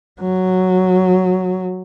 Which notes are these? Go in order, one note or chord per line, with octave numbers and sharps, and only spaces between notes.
F#3